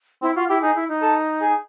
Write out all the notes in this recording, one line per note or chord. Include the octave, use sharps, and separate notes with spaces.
C4 E4
F4 F#4
E4 G4
D#4 G#4
E4
D#4
A4
G#4